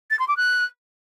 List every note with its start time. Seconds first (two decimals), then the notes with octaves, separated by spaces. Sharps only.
0.11 A6
0.19 C6
0.28 D6
0.37 F#6